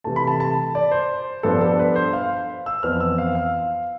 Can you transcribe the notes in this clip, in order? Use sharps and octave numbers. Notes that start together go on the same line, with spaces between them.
C3 E3 A3 A5
B5
A5
A5
D5
C5
G2 F3 B3 D4 A4
A4
B4
C5
F5
E6
F2 E3 B3 F6
E6
F5
F5